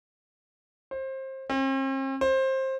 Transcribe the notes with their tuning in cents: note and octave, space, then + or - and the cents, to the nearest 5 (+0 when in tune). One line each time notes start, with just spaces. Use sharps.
C5 +25
C4 +45
C5 +20